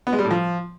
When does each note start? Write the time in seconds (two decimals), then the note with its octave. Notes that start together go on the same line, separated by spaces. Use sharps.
0.07 B3
0.13 G#3
0.19 G3
0.25 A2
0.31 F3